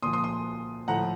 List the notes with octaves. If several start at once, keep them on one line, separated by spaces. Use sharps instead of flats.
A#2 F3 C6 D#6
C6 D#6
C6 D#6
A2 F3 F#5 A#5